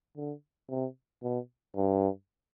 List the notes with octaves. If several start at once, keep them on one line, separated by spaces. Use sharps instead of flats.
D3
C3
B2
G2